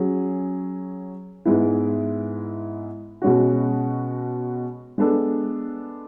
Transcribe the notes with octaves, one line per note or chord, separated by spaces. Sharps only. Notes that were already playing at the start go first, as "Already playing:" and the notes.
Already playing: F#3 C#4 G#4
G#2 G#3 B3 E4
B2 G#3 C#4 F#4
G#3 B3 D4 A4